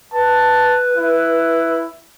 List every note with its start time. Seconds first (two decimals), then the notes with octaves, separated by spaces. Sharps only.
0.13 B4 A5
0.97 E4